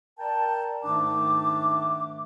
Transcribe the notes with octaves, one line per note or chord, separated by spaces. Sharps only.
A#4 D5 G5 A5
G#2 D#3 A3 D4 D6